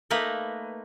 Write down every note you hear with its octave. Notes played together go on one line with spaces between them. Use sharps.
A3 A#3 D#4 B4